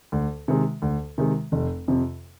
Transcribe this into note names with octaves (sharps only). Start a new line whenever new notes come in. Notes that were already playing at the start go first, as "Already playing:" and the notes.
D2
C3 D#3 G#3
D2
C3 D#3 G#3
F1
F2 C3